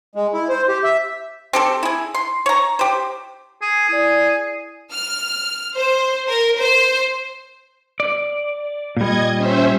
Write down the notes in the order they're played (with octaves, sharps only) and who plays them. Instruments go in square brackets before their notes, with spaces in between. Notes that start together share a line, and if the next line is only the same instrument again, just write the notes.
[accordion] G#3
E4
C5
G4
E5
[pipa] C4 G4 A4
E4 G#4
C6
C#5 A#5
G4 C5
[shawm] G#4
[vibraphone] E4 D5 [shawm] G#4
[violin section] F6
C5
A#4
C5
[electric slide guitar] D5
[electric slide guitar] A#2 G3 [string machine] D#5 G#6
[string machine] C#4 C5 E5